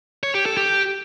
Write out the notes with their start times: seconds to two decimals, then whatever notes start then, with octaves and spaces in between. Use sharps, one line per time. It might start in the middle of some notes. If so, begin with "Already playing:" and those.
0.23 C#5
0.35 G4
0.46 A4
0.57 G4